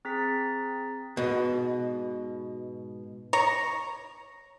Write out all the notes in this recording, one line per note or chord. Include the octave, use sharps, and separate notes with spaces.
C4 G#4 A#5 A6 B6
G#2 B2
C#5 A#5